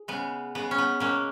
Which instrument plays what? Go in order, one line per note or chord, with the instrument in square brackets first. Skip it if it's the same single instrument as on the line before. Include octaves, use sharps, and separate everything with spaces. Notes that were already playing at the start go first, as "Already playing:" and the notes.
Already playing: [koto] G#4
C#3 G#3 B3
C#3 G#3 B3
C#4
B3
B2 G#3 A#3 C#4